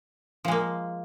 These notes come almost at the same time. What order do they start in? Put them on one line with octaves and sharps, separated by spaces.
F3 G#3 A#3